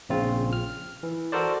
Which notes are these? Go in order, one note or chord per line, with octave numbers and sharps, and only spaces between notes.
A#1 C#3 C4 F4
F6
E3
F#4 A4 A#4 C5 D5